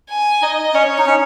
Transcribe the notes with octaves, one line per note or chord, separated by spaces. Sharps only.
G#5
D#4 D#5
C#4 C#5
D#4
C#4